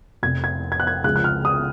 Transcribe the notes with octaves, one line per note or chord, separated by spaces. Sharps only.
F1 F2 C3 G#6
G#6
G#6
F#6
G#6
C#2 C#3 F3 F#6
F#6
F6
D#6